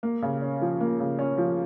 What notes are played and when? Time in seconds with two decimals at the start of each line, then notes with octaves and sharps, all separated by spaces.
0.03 A#3
0.22 C#3
0.42 C#4
0.61 F3
0.81 A#3
1.00 C#3
1.19 C#4
1.38 F3